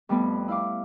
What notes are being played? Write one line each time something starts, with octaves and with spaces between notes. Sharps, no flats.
F2 G3 A3 B3 B4
E4 F5 D6